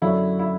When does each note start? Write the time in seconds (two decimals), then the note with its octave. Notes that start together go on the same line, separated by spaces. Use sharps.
0.02 F#2 D3 F#3 E4
0.39 E4